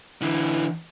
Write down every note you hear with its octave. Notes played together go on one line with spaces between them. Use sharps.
D3 E3